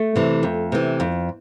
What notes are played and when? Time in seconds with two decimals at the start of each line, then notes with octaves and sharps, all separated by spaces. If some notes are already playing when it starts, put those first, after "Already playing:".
Already playing: A3
0.16 C3 E3
0.43 F2
0.72 C3 E3
1.00 F2